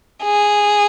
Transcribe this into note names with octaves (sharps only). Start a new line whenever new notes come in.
G#4